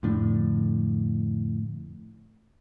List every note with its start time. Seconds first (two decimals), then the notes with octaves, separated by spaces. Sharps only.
0.03 F2 A2 D3